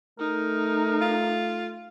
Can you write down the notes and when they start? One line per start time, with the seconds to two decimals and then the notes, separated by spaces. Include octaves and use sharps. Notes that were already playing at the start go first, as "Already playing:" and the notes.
0.19 A3 D#4 A#4
1.01 F4